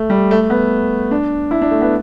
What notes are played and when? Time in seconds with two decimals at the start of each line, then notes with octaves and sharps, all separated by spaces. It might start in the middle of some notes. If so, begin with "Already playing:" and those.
Already playing: A3
0.10 G3
0.31 A3
0.50 B3
1.11 D4
1.51 E4
1.62 D4
1.71 A3
1.81 B3